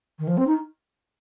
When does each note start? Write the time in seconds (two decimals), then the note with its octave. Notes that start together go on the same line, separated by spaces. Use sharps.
0.19 D#3
0.27 F3
0.37 C4
0.47 D#4